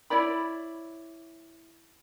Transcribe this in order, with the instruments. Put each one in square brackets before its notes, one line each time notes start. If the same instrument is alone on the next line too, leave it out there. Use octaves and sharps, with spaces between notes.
[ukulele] E4 C#5 D5 B5